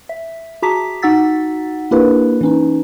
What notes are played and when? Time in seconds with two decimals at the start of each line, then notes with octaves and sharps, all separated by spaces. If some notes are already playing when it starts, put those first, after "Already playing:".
0.09 E5
0.62 F#4 G#4 A5 A#5 D6 B6
1.02 D#4 F#4 F#5 E6 A6 B6
1.91 A#3 D4 E4 G4 A#4 B4
2.41 E3 C#4 D#4